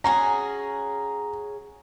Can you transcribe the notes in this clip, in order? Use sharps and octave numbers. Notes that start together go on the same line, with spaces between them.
C#4 F#4 G#4 A#5